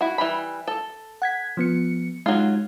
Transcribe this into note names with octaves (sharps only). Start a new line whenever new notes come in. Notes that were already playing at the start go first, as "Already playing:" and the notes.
E4 F#4
E3 G3 B5
A4
F#5 G#6 B6
F3 B3 C#7
F#3 G#3 D#4 F4